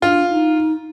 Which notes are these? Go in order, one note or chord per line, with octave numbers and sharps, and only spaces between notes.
D4 F4
D#4